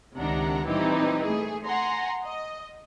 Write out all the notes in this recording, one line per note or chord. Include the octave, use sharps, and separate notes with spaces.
C#2 C3 D#3 D4 F#5 A#5
A#2 E3 G3 C4 D#4 G4
A3 G#4
F#5 G#5 A#5 C6
D#5